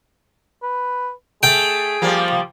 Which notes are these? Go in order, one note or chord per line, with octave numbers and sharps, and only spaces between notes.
B4
A3 G#4 G5
F3 G3 A#3